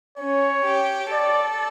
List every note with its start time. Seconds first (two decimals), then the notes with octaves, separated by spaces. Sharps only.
0.17 C#4 C#5
0.65 G4
1.12 A4 D5